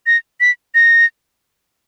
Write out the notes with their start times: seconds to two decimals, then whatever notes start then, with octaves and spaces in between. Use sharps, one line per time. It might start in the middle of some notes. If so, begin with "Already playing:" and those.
0.07 A#6
0.40 B6
0.75 A#6